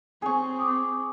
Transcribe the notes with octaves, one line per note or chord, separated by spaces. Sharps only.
C4 G#4 C#6
D6 D#6